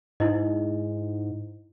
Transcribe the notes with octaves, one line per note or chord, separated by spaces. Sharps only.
G#2 D#4 E4 D#5